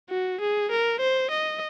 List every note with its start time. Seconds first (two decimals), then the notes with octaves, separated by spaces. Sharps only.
0.10 F#4
0.41 G#4
0.71 A#4
1.00 C5
1.31 D#5